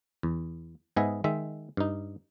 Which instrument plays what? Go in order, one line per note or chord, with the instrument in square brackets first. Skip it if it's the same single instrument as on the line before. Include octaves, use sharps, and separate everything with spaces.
[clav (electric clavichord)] E2
G#2 B3 G#4 D#5 E5
D#3 G#3 E5
G2 D#4